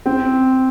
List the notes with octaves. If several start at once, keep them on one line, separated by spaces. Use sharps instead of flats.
C4